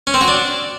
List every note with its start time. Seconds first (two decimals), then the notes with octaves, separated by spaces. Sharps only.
0.07 C#4
0.14 C4
0.21 F#4
0.28 D4